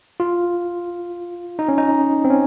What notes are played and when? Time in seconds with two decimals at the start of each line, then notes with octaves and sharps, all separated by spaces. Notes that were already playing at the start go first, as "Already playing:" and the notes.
0.20 F4
1.59 D#4
1.68 C#4
1.78 D#4
2.25 C4
2.30 C#4